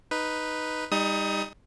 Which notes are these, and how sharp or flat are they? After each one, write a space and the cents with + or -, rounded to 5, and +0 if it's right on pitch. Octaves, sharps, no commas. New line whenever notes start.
D#4 +0 B4 +0
G3 +30 D#4 +0 D#6 +30